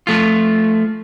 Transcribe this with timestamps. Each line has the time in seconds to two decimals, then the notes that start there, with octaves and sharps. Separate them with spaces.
0.07 F3 A3 F4